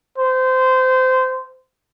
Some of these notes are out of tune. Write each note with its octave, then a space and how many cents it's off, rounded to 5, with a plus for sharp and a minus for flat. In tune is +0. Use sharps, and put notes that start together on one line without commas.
C5 -20